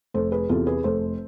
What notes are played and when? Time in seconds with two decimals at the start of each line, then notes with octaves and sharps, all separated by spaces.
0.14 F1 A4 C5
0.32 G#4 B4
0.49 E2 C3 F4 A4
0.67 G#4 B4
0.84 F1 A4 C5